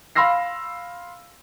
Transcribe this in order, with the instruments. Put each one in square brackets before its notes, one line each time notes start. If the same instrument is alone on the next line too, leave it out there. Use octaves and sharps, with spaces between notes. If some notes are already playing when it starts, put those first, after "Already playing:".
[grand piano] F5 B5 C6 E6 A#6 C7